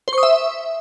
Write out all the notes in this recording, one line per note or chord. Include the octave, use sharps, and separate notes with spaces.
C5
C#6
D#6
E5